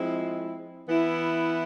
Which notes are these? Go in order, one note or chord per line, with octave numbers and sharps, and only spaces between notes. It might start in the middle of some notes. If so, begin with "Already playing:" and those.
Already playing: F3 G#3 C4 E4
E3 B3 E4